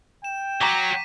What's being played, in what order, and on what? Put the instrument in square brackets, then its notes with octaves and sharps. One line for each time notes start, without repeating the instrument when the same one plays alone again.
[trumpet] G5 [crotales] E7
[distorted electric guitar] F#3 [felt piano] A#5 C#6 D6 [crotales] B6 D#7